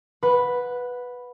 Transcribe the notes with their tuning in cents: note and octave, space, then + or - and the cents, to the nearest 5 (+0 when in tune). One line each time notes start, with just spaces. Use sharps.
B4 +0 F#5 -25 B5 +0